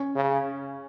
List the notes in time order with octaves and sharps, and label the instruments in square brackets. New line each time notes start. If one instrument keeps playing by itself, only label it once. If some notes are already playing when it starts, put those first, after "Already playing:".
Already playing: [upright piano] C#4
[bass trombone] C#3